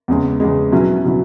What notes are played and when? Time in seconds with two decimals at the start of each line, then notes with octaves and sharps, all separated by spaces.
0.08 E2 C#3 G#3
0.40 E2 C#3 G#3
0.72 B2 F#3 C#4 E4
1.04 B2 F#3 C#4 E4